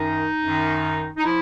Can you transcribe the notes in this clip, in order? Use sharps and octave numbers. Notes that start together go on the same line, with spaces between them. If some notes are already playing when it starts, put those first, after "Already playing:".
Already playing: F#2 D#3 D#4
F#2 D#3
D#4
F3 E4